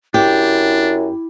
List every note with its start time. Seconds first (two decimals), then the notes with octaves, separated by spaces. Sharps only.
0.14 F#2 D4 E4 G4